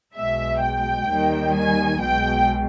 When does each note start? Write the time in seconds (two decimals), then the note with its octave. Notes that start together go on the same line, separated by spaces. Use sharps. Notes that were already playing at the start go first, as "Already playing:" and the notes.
0.15 B1 B2 G#3 E5
0.61 G5
1.08 D#2 D#3 G3
1.54 G#5
2.00 B1 B2 G#3 G5